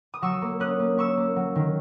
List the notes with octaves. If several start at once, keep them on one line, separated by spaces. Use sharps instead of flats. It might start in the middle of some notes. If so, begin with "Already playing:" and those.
D#6
F#3 C#6 E6
A#3
C#4 D#6 F#6
A#3
C#4 C#6 E6
A#3
F#3
D#3